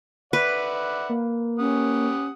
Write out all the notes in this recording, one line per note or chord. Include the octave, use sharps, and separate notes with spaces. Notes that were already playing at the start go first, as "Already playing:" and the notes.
B4 D5 E5 F#5
A#3
C#4 G4 F#5 D#6